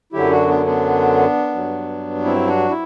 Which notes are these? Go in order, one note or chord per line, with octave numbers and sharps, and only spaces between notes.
F#2 D3 F#3 E4 G4
D4 F#4
B3 D4
B3 D4
G2 F#3
C4 E4
D4 F#4
E4